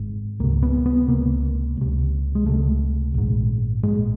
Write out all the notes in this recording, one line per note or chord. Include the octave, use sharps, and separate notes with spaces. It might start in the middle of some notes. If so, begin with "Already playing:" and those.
Already playing: G#1 G#2
C#2 C3 A#3
B3
B3
C#2 C3 A#3
C#2 C3
G#3
C#2 C3 A3
A#1 G#2
A#1 G#2 G#3